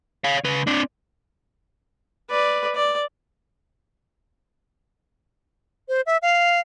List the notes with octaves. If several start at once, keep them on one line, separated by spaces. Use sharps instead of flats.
C#5 F5
C#3 B4
C4 D4
B4 D5
D5
C5
E5
F5